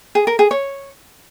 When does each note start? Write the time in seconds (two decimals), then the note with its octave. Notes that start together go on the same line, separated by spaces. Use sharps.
0.15 G#4
0.27 A#4
0.39 G#4
0.51 C#5